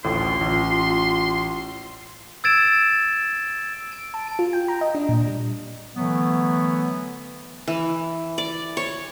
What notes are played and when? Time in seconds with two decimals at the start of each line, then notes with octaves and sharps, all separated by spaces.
0.04 A1 D2 A2 F4 C6
0.41 A1
2.44 E6 G#6 A6 D7 E7
3.92 D7
4.14 A5
4.27 D7
4.39 F4
4.53 G5
4.68 A#5
4.81 D#5
4.95 D4
5.09 A#2
5.27 G3
5.96 D3 E3 F#3 A3 B3
7.68 E3
8.38 D5
8.77 C#5